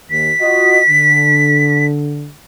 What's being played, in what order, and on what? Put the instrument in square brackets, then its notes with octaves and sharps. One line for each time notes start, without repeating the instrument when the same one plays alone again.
[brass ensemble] D#2 [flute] B6
[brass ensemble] F4 F#4 D#5
D3